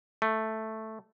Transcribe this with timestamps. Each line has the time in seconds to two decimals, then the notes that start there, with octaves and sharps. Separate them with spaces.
0.22 A3